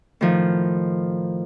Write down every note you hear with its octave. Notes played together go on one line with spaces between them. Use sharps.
A2 D#3 F3